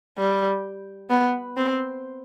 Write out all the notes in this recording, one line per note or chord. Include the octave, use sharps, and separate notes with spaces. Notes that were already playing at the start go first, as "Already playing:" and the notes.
G3
B3
C4